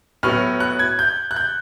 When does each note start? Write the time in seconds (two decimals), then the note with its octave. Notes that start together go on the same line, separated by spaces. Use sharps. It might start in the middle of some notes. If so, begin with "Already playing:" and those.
0.23 A2 F#3 B3 F6
0.60 F#6
0.79 G#6
0.99 G6
1.31 F#6
1.36 G6